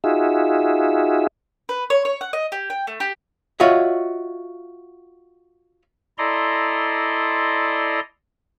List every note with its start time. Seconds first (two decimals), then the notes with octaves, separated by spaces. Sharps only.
0.04 D#4 F4 F#4 G#4 E5
1.69 B4
1.90 C#5
2.05 C#5
2.21 F#5
2.33 D#5
2.52 G4
2.70 G5
2.87 A3
3.00 G4
3.60 F4 F#4 C#5 D#5 E5
6.18 E4 A4 D5 D#5 A#5 C6